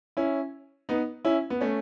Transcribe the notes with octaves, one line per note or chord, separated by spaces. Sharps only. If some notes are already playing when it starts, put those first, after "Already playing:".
C#4 E4
B3 D#4
C#4 E4
B3
A3 C#4